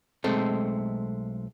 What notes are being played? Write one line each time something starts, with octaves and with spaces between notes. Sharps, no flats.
B1 G#3 A3 C4 A4